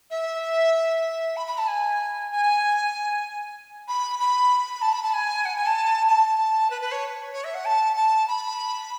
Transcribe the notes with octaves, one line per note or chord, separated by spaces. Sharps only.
E5
B5
B5
A5
G#5
G#5
B5
B5
A5
B5
A5
G#5
F#5
G#5
A5
A5
B4
B4
C#5
C#5
E5
F#5
A5
A5
B5